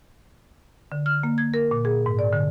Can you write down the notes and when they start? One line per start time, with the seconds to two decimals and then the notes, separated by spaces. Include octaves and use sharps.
0.92 D3
1.06 F6
1.23 A#3
1.38 G#6
1.54 A#4
1.71 A#2
1.85 G#4
2.06 G#2
2.19 D5
2.33 D3